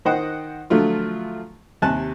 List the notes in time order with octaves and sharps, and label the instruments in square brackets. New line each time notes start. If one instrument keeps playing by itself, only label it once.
[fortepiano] D#3 C5 D#5 F#5 G5
D3 F3 F#3 A3 F4
D#2 C3 G#5 A5 F#6